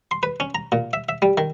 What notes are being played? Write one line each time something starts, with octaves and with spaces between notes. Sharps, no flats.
C6
B4
C#4
A#5
A#2
E5
E5
G3
D#3